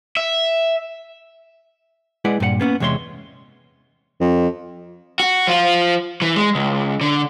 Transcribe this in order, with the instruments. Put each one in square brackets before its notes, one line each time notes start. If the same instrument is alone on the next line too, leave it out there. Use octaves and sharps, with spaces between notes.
[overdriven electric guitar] E5
[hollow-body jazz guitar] G#3 E4 G#4 B4 D5 F#5
G2 A#2 B4 F#5
A#3 B3 C#4 F#5
E2 C3 G#3 C#5 E5 C6
[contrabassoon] F2
[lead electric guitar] F#4
F3 F4
E3
G#3
C#2
D3